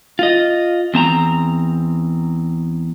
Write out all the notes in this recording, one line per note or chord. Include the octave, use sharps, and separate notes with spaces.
F4 D#5
E2 C4 A5 A#5